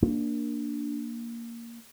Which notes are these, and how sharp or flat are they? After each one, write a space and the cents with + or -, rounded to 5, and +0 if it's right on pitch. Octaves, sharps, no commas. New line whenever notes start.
A#3 +0 D4 +0